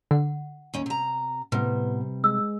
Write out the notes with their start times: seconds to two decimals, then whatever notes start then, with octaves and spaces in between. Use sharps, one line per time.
0.11 D3 F#5
0.74 D#2 C#4
0.86 C3 A#5
1.52 A2 C3 G3 B3 B4
2.24 G#3 E6